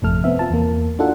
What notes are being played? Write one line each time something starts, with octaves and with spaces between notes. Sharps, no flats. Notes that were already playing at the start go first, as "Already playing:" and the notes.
G#1 F2 C3 A3 A4 F6
B3 C4 E5
F4 A5
E2 A#3
D4 D#4 F4 F#4 A4 F#5